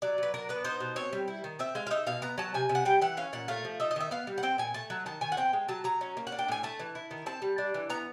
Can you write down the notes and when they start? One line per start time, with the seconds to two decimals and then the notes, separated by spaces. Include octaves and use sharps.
0.02 F#3 D5
0.18 F#3 B4
0.34 D4 A#4
0.49 B3 B4
0.65 D#4 C5
0.80 B2
0.96 C4 C#5
1.13 G3
1.28 E4
1.44 D#3
1.59 C4 E5
1.75 G#3 F5
1.87 F5
1.91 D#4 E5
2.07 B2 F5
2.22 B3 A#5
2.38 F#3 A5
2.54 C3 G#5
2.69 C3
2.75 F#5
2.85 G3 G5
3.02 E3 F#5
3.17 C#4 F5
3.33 A#2 F#5
3.48 A3 F5
3.65 F3
3.80 D#4 E5
3.91 D#5
3.96 D#3 E5
4.11 B3 F5
4.27 G3
4.38 F#5
4.43 C4 G5
4.58 A#2 G#5
4.74 A3 A5
4.90 F#3
5.06 D#3 A5
5.21 D#3 G#5
5.32 F#5
5.37 C4 G5
5.53 G#3
5.68 F#3 A5
5.84 F#3 A#5
6.01 C#4
6.17 A#3
6.27 F#5
6.32 D4
6.39 G5
6.48 A2 G#5
6.63 A3 A5
6.79 E3
6.95 E4
7.11 D#3
7.26 C4 A5
7.42 G3
7.58 D4
7.74 E3
7.90 B3 A#5